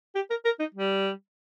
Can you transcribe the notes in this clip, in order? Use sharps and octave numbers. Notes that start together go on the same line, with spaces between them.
G4
A#4
A#4
D#4
G3